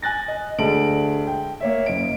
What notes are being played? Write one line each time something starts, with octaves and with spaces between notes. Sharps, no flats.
G#5 F#6 A6 A#6
D#5
D2 G#3 A5 D7 F#7
G5
A#3 C#5 E5
F#1 D#5 D7